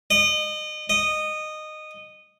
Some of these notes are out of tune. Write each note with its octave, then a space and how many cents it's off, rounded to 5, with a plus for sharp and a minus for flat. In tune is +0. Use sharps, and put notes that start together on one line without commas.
D#5 -30
D#5 -15